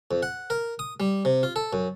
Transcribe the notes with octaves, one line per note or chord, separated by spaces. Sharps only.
F2
F#5
A#4
D#6
G3
C3
F4
A4
F#2